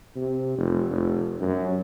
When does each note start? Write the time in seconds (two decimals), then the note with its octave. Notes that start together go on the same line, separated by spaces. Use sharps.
0.16 C3
0.58 F1
0.90 F1
1.41 F#2